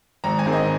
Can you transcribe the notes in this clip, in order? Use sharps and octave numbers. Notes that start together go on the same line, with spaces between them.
G#1 A#5
G#5
G#2 D#3 C4
D#5